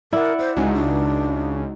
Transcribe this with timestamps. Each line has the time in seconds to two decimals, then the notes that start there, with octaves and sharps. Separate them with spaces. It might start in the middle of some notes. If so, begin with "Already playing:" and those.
0.13 E4 A#4 D5 F#5
0.39 C5 E5
0.56 C#2 G#3 D#4 F#4 G#5
0.73 D4